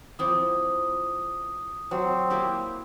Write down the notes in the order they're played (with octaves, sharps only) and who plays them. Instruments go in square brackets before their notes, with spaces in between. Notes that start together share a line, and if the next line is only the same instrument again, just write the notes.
[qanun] F3 C4 E4 [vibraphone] D6 D#6
[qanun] F#3 [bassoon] C4
[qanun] A#3 E4 G4